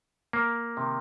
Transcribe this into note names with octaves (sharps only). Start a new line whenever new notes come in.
A#3
C3 D#3